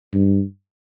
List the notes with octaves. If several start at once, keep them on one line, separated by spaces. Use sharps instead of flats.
G2